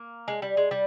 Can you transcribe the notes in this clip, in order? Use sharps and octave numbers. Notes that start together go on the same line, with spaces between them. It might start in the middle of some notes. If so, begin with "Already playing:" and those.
Already playing: A#3
G#3
G3
G#3
G3